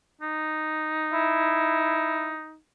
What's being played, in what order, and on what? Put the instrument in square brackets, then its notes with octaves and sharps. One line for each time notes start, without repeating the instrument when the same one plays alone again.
[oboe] D#4
[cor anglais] E4